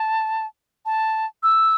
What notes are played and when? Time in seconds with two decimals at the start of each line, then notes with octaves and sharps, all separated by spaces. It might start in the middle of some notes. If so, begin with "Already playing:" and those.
Already playing: A5
0.86 A5
1.43 E6